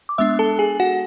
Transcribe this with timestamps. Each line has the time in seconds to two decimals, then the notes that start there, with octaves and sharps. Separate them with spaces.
0.09 D6
0.18 G#3 B3 D4 E5 E6
0.39 A4 A5
0.59 G#4 G#5
0.80 F#4 F#5